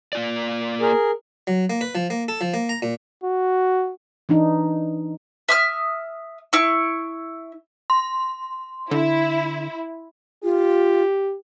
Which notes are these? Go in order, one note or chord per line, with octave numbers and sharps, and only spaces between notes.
A#3 F4 D5
G#4 A#4
F#3
A#3
B4
F3
A#3
A4
F3
A#3
A#5
A#2
F#4
E3 D4 D#4
E5 D#6 F6
E4 C#6
C6
D3 E4
F4 G4